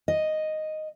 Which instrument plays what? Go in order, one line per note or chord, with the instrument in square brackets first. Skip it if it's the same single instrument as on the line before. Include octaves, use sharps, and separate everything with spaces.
[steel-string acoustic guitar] D#5